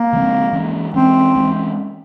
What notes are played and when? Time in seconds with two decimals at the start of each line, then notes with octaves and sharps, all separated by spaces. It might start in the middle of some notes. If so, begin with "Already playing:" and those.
Already playing: A#3
0.13 C#3 F3 G#3 C4
0.53 E3 G#3 C#4
0.94 E3 G#3 C4 C#4
1.35 E3 G#3 C#4